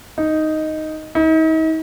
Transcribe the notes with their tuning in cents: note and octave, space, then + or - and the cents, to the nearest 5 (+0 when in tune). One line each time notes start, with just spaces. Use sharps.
D#4 +0
D#4 +40